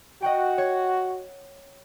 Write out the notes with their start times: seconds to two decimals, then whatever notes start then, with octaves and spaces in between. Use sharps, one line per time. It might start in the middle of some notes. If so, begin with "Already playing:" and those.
0.22 F#4 D#5 F#5 G5
0.58 C#5